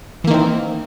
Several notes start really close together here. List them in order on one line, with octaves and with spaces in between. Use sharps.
E3 A#3 D#3 C4